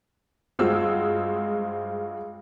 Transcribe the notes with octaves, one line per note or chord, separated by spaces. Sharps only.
G2 G#3 C4 F4 F#4 E6